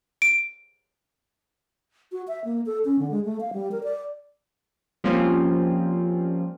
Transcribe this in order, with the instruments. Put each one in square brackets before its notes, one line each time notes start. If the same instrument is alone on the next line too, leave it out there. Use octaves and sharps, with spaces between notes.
[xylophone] D7
[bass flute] F#4
E5
A#3
A4
C#4
D3
G#3
A3
F5
G3
A#4
D5
[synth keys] F3 G3 A#3 C4 C#4 F4